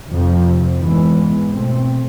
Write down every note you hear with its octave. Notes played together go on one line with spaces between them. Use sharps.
F2 C3 F3
G#2 E3 G#3 B3
B2 A3 C4